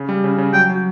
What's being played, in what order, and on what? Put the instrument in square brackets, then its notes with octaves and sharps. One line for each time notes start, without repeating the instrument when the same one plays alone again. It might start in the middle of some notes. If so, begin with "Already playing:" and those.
Already playing: [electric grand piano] C#3
G3
C#3
C#3
[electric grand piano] F#3 [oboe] G5
[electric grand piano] F#3